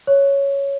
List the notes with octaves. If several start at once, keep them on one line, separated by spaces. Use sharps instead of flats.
C#5